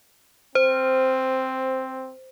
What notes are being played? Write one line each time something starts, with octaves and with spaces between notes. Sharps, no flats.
C4 C5